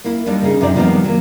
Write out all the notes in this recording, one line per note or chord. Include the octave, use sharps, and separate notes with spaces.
A#3 E4
D#2 D#3 G3 D4
C#3 D#4 G#4
F#2 C3 D4 D#4 G4 D5
C3 D#3 F3 G3 B3 C4
F#3 A#3